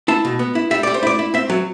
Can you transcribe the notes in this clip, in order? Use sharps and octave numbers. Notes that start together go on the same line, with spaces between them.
E4 A5
B2
B3
E4
G3 E5
G3 D5
C5
E4 D5
E4
C4 E5
F#3